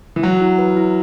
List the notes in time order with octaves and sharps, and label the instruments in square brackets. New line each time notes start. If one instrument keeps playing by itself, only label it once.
[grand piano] E3
[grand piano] F#3 [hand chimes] F#5
[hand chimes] E4
B4
E4